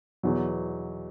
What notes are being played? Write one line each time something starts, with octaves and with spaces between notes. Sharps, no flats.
E2 B2 F#3